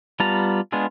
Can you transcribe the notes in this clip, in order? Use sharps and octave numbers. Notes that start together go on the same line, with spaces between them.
G3 B3 F4 A5 A#5
G#3 B3 D4 F4 G#4